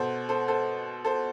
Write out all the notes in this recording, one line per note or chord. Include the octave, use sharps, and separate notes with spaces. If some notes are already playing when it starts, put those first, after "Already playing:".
Already playing: B2 A4 C5
A4 C5
A4 C5
A4 C5